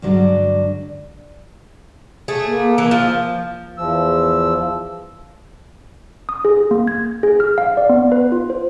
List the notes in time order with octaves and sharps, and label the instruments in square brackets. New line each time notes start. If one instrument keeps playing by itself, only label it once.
[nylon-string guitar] G2 D3 F#3 G#3 D4
[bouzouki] A3 G#4
[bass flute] A#3
[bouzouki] E3
F3
[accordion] E2 F3 E6
[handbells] D#6
G#4
A#3
G#6
G#4
F6
F5
D5
B3
B4
F4
C5